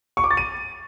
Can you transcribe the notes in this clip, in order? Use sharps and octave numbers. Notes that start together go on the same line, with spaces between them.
C#6
D6
A6
D#7